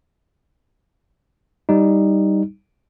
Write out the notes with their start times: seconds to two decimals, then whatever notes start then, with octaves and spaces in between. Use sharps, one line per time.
1.69 G3 D#4